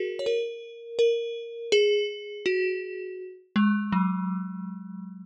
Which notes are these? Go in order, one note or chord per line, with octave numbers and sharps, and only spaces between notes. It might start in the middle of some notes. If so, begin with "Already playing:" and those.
Already playing: F#4 G#4 A#4
C#5
A#4
A#4
G#4
F#4
G#3
F#3